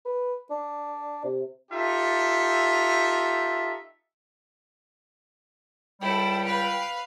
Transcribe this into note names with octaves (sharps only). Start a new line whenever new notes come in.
B4
D4
C3
D#4 F4 G4 A4 E5
C#2 G3 E4 A4 G5
B4 F5